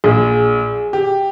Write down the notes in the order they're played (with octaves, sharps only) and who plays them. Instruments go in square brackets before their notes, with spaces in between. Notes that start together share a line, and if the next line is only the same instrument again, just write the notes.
[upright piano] A#1 [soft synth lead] G#4
[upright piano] G4